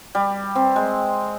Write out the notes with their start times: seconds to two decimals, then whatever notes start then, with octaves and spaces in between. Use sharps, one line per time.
0.15 G3
0.55 C4
0.76 G#3